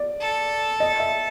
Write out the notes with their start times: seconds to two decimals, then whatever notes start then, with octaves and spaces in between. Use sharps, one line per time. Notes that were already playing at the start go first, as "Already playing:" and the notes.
Already playing: D5
0.21 A4
0.80 D#5
1.00 E5